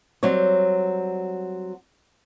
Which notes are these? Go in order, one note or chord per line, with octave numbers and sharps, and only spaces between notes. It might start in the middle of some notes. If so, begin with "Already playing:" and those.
F#3 G3 C4 C#5